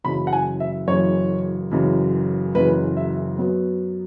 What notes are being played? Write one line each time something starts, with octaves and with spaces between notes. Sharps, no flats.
F#1 F#2 C#3 E3 B5
F#5
G#5
E5
F#1 F#2 C#3 E3 C#5
F#1 F#2 C#3 E3
F#1 F#2 C#3 E3 B4
E5
F#2 F#3 B3